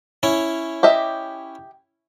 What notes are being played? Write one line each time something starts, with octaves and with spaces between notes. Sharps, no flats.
C#4 E4
G4 D#5 E5